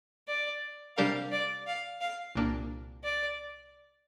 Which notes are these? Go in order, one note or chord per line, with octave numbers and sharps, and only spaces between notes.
D5
C3 G3 D4 G4 A#4 F5
D5
F5
F5
C2 A#2 A#3 D4
D5